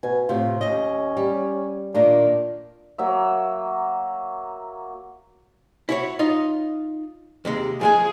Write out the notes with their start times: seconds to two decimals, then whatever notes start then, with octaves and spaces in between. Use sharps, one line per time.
0.03 B2 G#5
0.29 A2 C3 F4
0.61 D#2 C#4 D#5
1.17 G3
1.94 A#2 D#3 A#3 D4
2.98 F#3 A#3 E5
5.89 E4 F#4 C#5
6.19 D#4 F4 D#5
7.45 D#2 C3 G#3
7.81 F3 G#3 G#4 G#5